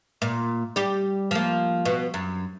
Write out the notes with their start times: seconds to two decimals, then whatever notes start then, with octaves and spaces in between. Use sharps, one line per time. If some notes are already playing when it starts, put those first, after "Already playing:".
0.22 A#2
0.76 G3 G4
1.31 F3 A#3
1.85 B2
2.14 F#2